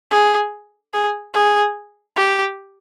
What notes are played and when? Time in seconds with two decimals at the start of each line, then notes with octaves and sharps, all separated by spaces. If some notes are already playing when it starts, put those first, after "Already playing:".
0.11 G#4
0.93 G#4
1.34 G#4
2.16 G4